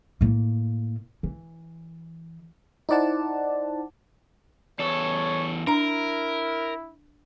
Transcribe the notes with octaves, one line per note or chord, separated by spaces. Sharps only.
A2 A#3
E3
D#4 E4 C5 D5 F#5 A5
E2 A4 C#5
D4 E4 A#4 A#5